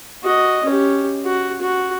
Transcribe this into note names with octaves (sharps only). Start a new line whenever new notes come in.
F#4 D#5
C#4 G4
F#4
F#4